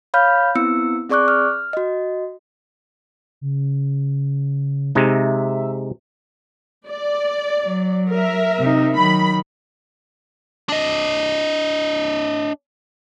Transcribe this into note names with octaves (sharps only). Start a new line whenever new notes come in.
C#5 F5 B5 F6 G6
B3 C4 E4 E6 C#7
C4 G#4 D5 C#6 D6 F#6
F6
F#4 D#5
C#3
C3 G#3 D#4 E5
D5
F#3
A#4 E5
C3 D#4
D#3 F#3 B5
D4 D#5